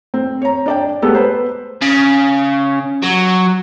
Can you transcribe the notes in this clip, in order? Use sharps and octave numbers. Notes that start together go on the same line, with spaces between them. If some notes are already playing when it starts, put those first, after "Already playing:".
C4
C#5 A#5
D4 D5 G5
G#3 A3 B3 G4 A4
B4 C5
C#3
F#3